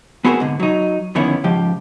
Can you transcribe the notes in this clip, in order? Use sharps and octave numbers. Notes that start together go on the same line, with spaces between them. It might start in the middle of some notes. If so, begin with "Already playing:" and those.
B3 C4 F#4 G#4 A#4 C5
G#2 D3
F#3 D#4
F2 D3 D#3 B3 C#4 E4
C#2 G#2 F3 G4